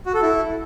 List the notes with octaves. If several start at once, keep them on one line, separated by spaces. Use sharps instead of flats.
F#4
A4
E4